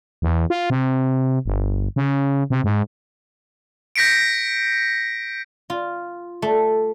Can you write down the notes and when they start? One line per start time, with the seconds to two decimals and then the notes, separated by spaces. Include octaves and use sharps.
0.22 E2
0.50 F4
0.70 C3
1.46 G1
1.96 C#3
2.50 C3
2.64 G#2
3.96 G6 A#6 B6 C#7 D7
5.70 F4
6.42 A3